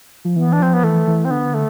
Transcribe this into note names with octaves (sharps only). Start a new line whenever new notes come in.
F3
E3 B3
D4
F3 C4
B3
E3 A3
E3
C4
D3 B3
A3